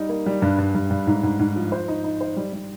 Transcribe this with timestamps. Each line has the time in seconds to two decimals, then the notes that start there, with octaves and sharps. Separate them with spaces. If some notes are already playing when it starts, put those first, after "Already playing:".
Already playing: G3 D#4
0.09 A#3
0.26 G3
0.42 G2
0.58 G2
0.75 G2
0.90 G2
1.07 G#2
1.23 G#2
1.39 G#2
1.56 F3
1.72 C5
1.88 D#4
2.04 D#4
2.21 C5
2.37 G3
2.53 G3